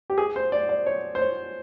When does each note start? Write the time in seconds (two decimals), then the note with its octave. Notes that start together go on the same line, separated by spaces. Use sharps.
0.10 G4
0.18 G#4
0.36 C5
0.52 D5
0.69 D5
0.86 C#5
1.15 C5
1.21 C#5